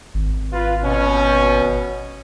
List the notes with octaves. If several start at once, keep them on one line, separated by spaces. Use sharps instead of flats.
G#1
F4 B4
B2 C#4